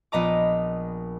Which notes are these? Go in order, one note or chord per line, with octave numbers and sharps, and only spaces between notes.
A#1 B3 D#5 A#5 D6